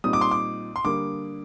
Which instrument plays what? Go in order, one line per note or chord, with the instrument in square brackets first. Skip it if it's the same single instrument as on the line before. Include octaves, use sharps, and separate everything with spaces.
[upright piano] A#2 G3 C4 D#4 [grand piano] D#6
[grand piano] D6
C6
D6
C6
[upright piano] D3 G3 A#3 [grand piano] D6